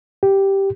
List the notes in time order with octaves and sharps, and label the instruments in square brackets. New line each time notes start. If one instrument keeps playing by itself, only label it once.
[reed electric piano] G4